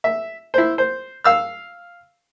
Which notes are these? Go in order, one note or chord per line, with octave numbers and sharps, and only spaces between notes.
E5
E4 C5
C5
F5 E6 F6